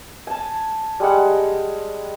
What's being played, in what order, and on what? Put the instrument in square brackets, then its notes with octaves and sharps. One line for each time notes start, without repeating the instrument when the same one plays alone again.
[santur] G#5 A5
G3 G#3 F#5